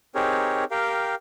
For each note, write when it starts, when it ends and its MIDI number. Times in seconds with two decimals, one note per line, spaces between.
0.15 0.64 60
0.15 0.64 63
0.15 0.64 67
0.15 0.64 68
0.15 0.64 70
0.15 0.64 73
0.71 1.15 67
0.71 1.15 70
0.71 1.15 77
0.71 1.15 79